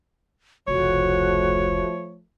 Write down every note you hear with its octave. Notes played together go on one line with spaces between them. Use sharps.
F1 C#2 F3 A3 F#4 C#5